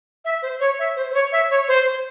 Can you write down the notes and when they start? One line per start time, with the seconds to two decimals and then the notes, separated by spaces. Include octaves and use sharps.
0.25 E5
0.42 C5
0.60 C#5
0.79 E5
0.96 C5
1.10 C5
1.14 C#5
1.32 E5
1.50 C#5
1.68 C5